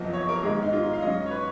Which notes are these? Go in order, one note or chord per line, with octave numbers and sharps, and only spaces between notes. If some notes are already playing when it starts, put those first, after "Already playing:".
Already playing: F#1 F2 F3 B3 D#5
C#5
A#4
G#2 D#3 G#3 B3 G#4
D#4
F4
F5
G#2 F#3 C#4 D#5
C#5
B4